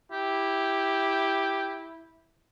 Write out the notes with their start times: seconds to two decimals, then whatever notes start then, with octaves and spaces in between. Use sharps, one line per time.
0.11 E4 G4